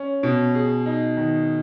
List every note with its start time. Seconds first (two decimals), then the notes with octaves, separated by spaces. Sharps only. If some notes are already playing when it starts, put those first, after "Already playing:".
Already playing: C#4
0.23 B2
0.55 G#4
0.86 D#4
1.17 D#3